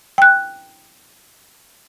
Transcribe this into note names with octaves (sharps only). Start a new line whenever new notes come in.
G5 F#6